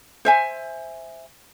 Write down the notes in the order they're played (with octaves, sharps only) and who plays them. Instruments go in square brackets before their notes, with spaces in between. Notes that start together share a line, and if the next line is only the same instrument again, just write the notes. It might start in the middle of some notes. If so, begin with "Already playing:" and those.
[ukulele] C5 E5 G#5